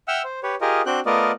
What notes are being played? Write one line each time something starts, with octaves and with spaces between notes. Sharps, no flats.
E5 F#5 G5 E6 F6
C5
G4 B4 C#5
F4 G4 G#4 A#4 D#5
C4 D4 F#4 G5 F#6
A3 B3 F4 A#4 D5 D#5